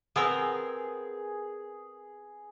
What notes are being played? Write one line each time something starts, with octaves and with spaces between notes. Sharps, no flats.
B3 C4 G#4 A#4